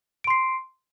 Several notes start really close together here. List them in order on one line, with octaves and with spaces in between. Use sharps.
D7 C6 C7